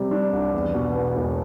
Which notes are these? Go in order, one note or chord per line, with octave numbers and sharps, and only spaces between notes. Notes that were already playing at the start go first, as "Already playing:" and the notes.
Already playing: C3 G3
D4
C2
E2
B2
B3
E1